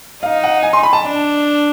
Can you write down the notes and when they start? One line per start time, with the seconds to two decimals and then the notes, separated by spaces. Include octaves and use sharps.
0.23 D#4 F5
0.44 F#5
0.63 G#5
0.73 C6
0.83 B5
0.93 A5
1.03 D4